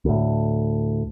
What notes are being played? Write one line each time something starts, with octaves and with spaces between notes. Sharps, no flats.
D2 A2